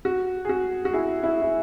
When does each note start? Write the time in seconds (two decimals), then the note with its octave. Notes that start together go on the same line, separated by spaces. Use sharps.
0.05 F#4
0.45 G#4
0.49 F#4
0.85 F#4
0.93 E4 G#4
1.23 E4
1.42 E4